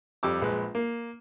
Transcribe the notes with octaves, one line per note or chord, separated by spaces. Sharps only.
F2 G3 D6 E6
A#1 G#3 B4
A#3